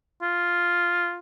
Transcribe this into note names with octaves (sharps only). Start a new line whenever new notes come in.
F4